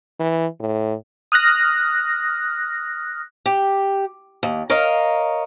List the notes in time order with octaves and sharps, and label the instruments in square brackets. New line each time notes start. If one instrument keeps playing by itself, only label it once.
[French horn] E3
A2
[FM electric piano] D#6 F6 F#6 A#6
[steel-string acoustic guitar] G4
D#2
A#4 C#5 D#5 F5